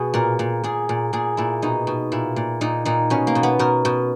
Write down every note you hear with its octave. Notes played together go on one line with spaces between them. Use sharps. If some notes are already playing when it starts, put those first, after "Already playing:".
Already playing: B2 G#4
A#2 A#4
A#2
A#2 G#4
A#2
A#2 G#4
A#2 E4
B2 D#4
B2
A#2 E4
A#2
A#2 D#4
A#2 D#4
B2 C#4
A#3
B2
B3
B2 A#4
B2